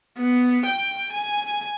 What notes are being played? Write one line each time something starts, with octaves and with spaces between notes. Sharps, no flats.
B3
G5
G#5